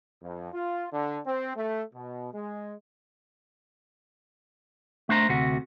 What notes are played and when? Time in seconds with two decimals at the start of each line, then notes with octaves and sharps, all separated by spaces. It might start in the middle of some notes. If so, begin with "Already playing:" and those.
0.21 F2
0.53 F4
0.92 D3
1.26 C4
1.55 A3
1.94 B2
2.33 G#3
5.09 A3 D4 C5 A#5
5.29 D2 C3 F#4